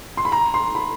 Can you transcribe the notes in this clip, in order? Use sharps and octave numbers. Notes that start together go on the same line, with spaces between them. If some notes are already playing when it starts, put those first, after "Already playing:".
C6
B5
A#5
C6
B5